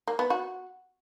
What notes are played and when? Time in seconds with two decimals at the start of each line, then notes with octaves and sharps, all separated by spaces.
0.08 A#3
0.19 B3
0.30 F#4